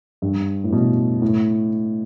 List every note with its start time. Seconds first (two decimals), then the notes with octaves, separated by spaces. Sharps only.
0.22 G2
0.64 A2
0.73 B2
1.22 A2